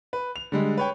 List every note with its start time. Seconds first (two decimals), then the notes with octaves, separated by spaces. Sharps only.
0.13 B4
0.36 F7
0.52 D3 G3 G#3
0.77 B4 C#5 G5